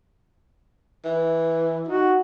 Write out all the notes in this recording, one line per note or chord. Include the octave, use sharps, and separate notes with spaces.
E3
D#4 F#4